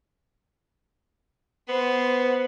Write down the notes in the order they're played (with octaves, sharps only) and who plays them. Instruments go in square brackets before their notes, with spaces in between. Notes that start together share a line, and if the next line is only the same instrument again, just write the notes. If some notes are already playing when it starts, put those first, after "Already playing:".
[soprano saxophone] B3 [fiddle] C5